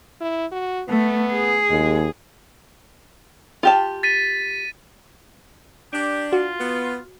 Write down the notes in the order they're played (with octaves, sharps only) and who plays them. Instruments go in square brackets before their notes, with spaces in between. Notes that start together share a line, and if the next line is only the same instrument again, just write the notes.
[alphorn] E4
F#4
[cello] A3 [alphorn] B3
[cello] G#4
[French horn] D#2 [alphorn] G#3
[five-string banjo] F4 G4 A5
[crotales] A6 B6 D#7
[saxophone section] D4 [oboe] G4
[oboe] F4 [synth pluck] F#4
[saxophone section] B3